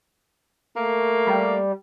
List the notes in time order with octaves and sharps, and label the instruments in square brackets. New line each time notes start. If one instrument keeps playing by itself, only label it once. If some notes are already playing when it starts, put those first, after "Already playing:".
[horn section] A3 A#3
[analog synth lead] G3